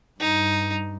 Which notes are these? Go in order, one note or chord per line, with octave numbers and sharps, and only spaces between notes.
G2 D#4